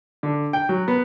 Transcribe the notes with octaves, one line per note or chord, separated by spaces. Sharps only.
D3
G5
F#3
B3